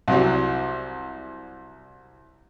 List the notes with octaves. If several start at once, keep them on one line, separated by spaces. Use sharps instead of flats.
C2 F#3 G3